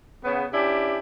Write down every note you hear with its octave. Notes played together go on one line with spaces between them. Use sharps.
C#3 B3
C#4 D4 E4 G4